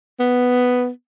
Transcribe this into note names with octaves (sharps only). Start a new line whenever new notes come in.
B3